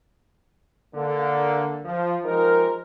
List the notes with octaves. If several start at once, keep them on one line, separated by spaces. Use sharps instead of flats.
D3 A#3
F3
F3 G#3 D#4 G4 A#4